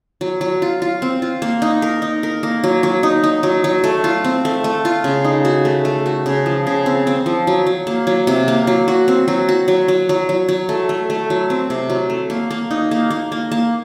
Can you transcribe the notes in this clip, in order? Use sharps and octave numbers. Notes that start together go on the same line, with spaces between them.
F#3
F#3
F4
F4
C4
F4
A#3
D#4
A#4
D#4
A#4
A#3
F#3
F#3
D#4
D#4
F#3
F#3
A3
F4
C4
A3
A3
F4
C#3
D#4
F#4
A3
A3
F#4
C#3
F3
C#3
C4
C4
F3
F#3
F#3
A#3
F#3
C3
A#3
F#3
F#4
C4
F#3
F#4
F#3
F#3
F#3
F#3
F#3
A3
A3
A3
F#3
C4
C3
F#3
A3
A#3
A#3
D#4
A#3
A#3
A#3
A#3